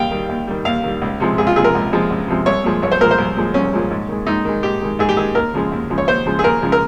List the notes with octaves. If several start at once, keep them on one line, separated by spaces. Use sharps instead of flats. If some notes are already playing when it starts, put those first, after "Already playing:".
Already playing: D#2 D#3 G3 F5 G5
D#3 G3
D#2
D#3 G3
D#2 F5
D#3 G3
C#2
C3 F3 G#3
C#2 G#4
F4
C3 F3 G#3 G#4
A#4
C#2
C3 F3 G#3
C#2
C3 F3 G#3
C2 C#5
A#2 F3 G#3
C2 C#5
C5
A#2 F3 G#3 A#4
C5
C2
A#2 F3 G#3
C2 C#4
A#2 F3 G#3
G#2
D#3 G#3
G#2 D#4
D#3 G#3
G#2 G4
D#3 G#3
G#2 G#4
G4
D#3 G#3 G#4
D#2 A#4
C#3 F3 G#3
D#2
C#3 F3 G#3
C#5
D#2 C5
C#3 F3 G#3
G#4
D#2 A#4
C#3 F3 G#3
A#4